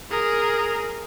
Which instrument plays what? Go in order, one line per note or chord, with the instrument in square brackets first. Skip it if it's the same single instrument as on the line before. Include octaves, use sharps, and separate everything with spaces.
[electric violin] G#4 A#4